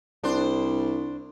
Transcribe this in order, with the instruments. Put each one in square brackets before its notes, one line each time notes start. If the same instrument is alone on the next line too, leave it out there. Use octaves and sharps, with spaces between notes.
[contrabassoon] C2 [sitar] D4 C5